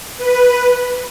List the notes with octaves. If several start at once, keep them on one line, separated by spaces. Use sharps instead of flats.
B4